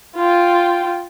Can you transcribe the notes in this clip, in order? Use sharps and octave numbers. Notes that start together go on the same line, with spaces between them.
F4 G5